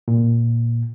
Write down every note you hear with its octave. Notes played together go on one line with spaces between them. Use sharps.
A#2